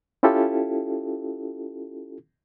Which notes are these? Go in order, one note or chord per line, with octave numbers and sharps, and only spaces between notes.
C#4 E4 F4 G4 A4